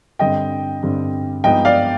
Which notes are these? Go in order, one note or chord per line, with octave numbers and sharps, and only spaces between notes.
G2 D3 G3 C4 D#5 G5
G2 D3 G3 C4
G2 F3 G#3 B3 D#4 D#5 G5
D5 F5